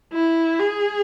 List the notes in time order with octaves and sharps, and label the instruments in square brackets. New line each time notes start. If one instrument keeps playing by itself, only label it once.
[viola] E4
G#4